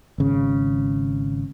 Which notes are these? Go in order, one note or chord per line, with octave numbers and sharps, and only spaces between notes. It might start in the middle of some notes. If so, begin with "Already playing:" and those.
G#1 C#3